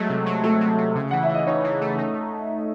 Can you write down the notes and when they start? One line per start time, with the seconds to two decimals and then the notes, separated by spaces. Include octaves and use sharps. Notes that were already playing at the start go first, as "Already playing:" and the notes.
Already playing: F#3 G#3 A3
0.10 C3
0.26 F#3
0.43 F#3 A3 A4
0.61 C3
0.78 C3
0.95 C#3
1.11 E3 F#5
1.23 E5
1.29 E3
1.34 D#5
1.47 C#4 D#4 C#5
1.64 E3
1.81 A3
1.98 D#4